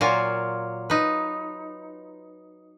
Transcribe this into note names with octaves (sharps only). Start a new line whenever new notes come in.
A#2 F#3 F4 G#5
D#4 B4